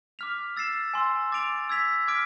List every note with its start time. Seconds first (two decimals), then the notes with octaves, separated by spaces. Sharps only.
0.19 D6 F6 B6 F7
0.56 E6 A6 C7 E7
0.94 G#5 C6 E6
1.32 D6 A6 D7 F7
1.69 E6 G#6 B6 F7
2.07 D6 F6 G#6 B6 D7